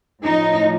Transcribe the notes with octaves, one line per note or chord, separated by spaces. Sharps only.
A2 F3 D#4